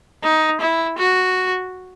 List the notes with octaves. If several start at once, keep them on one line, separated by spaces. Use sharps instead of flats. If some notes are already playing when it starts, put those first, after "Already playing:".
D#4
E4
F#4